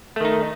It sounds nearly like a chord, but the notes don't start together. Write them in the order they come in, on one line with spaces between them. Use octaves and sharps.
A3 D#3 D#4